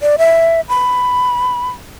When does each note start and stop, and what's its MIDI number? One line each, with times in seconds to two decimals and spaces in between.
0.01 0.16 74
0.18 0.61 76
0.69 1.69 83